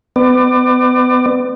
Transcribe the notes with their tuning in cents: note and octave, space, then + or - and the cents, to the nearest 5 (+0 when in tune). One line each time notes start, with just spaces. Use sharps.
B3 +35 D5 +30